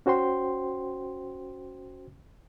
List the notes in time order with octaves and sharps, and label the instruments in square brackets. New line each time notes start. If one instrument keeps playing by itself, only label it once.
[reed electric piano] C#4 F#4 C5 G5 C6